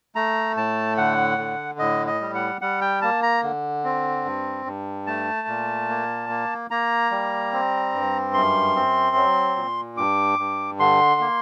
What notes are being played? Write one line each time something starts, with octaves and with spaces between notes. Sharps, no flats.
A3 A#5
A2 A5
D3 F#5
D3
A2 D#5
D#5
G3
F#5
G3 F#5
G5
A#3 A5
A#5
D3
C4
G2
G2
A3 A5
A#2
A#3
A#3
A#3 A#5
G3
C4
G2
F#2 C6
C4
F#3
A#2
G2 D6
G2
D3 C6
A#3